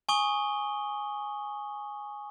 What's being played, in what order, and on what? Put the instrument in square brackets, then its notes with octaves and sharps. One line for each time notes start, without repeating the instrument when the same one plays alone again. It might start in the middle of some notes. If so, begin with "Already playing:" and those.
[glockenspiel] G#5 C#6 D#6 G7